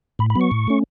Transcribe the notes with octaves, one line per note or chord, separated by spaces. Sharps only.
A2 B5
B5
F#3 B3
C#6
A2
A3 C#4